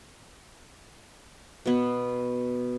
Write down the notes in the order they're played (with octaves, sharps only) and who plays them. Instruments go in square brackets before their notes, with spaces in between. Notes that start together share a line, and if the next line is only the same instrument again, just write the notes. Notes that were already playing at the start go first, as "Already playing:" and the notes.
[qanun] B2 B3